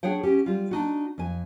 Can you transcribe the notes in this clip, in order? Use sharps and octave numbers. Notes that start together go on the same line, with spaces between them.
D4 G#4 C#5 F#5 G5
C#4 G4
G3 F4
D4 D#4 F#4
F2 G#5